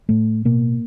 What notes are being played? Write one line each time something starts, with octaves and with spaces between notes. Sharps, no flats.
A2 A3
B2 A#3